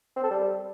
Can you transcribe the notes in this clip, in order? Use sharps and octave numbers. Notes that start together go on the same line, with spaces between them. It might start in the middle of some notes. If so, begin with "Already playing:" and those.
C4
A4
G3